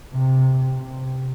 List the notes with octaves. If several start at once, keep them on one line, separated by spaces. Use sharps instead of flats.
C3
C3